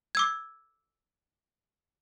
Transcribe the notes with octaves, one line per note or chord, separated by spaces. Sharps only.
D6 E6 G#6